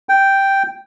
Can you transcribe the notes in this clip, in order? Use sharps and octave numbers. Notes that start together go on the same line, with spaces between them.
G5